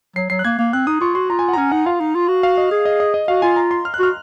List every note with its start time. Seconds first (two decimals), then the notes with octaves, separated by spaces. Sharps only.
0.16 F#3 C7
0.30 F#3 C7
0.39 F#6
0.45 A#3 G#6
0.59 A#3
0.73 C4 F#6
0.87 D#4 D#6
1.01 F4 C#6
1.15 F#4 C6
1.30 F4 A#5
1.39 G#5
1.48 F#5
1.53 A#5
1.57 C#4 G#5
1.72 D#4 F#5
1.86 F4 F5
2.00 D#4
2.15 F4
2.28 F#4
2.43 F5
2.58 D#5
2.71 G#4
2.85 D#5
3.00 D#5
3.14 D#5
3.28 F#4 F5
3.42 F4 G#5
3.56 A#5
3.71 C6
3.85 F6
3.94 F#6
4.00 F#4 F6